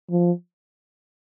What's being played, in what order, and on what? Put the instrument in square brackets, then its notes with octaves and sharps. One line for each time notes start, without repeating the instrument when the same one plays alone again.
[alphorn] F3